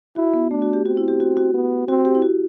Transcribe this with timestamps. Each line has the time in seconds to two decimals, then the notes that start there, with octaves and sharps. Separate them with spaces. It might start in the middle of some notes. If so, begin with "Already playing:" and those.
0.16 E4 F#4
0.34 B3
0.51 A3 D4
0.62 F#4
0.73 G4
0.85 C4 F#4
0.97 E4
1.08 G4
1.20 F#4
1.37 F#4
1.54 B3
1.88 C4 F#4
2.05 G4
2.15 E4
2.22 F#4